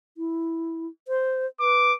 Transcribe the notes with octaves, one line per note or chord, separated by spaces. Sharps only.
E4
C5
B4 D6